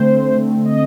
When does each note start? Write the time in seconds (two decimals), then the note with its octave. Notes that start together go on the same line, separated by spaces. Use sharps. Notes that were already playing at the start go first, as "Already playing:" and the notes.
Already playing: D3 A3 C4 C5
0.36 D3 A3 C4
0.65 D#5